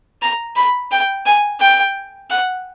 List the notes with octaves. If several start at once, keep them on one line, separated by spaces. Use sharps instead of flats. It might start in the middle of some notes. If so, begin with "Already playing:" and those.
A#5
B5
G5
G#5
G5
F#5